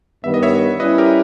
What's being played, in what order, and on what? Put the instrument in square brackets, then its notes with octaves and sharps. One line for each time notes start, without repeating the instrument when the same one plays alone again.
[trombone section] G2 D#3 G3 B3 [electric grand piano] E5
[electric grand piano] D#5
C#5 E5
[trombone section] G3 C#4 E4 [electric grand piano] B4 D#5
[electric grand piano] G4 A#4